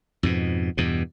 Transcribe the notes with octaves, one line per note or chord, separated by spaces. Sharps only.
F2 G#2 B2
E2 G2 B2